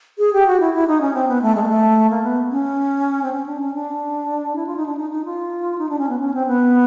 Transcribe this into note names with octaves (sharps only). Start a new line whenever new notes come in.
G#4
G4
F#4
E4
E4
D#4
C#4
C4
B3
A3
G#3
A#3
A3
A#3
B3
C#4
C4
C#4
D4
C#4
D4
E4
F4
D#4
D4
D#4
D#4
F4
D#4
D4
C#4
B3
C#4
C4
B3